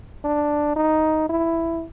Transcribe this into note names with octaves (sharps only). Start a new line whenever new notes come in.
D4
D#4
E4